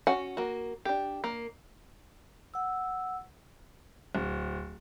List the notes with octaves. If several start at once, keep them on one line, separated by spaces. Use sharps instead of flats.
C#4 F#4 F#5 G#5
A#3 F#4
D4 G4
A#3
F#5 E6
D1